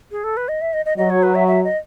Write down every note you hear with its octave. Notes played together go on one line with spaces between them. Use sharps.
G#4
A4
B4
D#5
E5
D#5
D#5
F#3 D#5
C#5
B4
E5
E5
D#5